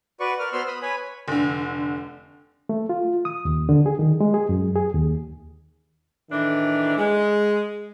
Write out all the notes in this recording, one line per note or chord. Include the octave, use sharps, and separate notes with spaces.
F#4 B4 D5 C#6
A#4 D5 F6
B3 F#4 C5 C6 E6 F6
B5 D#6
B4 C#5 G#5 B5
F1 D3
A3
F4
D#6
D#2
D3
G#4
D#3
G#3
G#4
F#2
G#4
D#2
A2 D#3 E3 D4
G#3